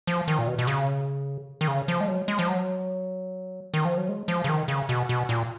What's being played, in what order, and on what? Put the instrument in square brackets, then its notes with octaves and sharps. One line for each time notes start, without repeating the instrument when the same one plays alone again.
[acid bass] F3
D#3
A#2
B2
B2
C#3
D#3
C#3
F3
G#3
F#3
G#3
F3
F#3
D#3
F3
F#3
G#3
F3
C#3
D#3
C#3
B2
B2
A#2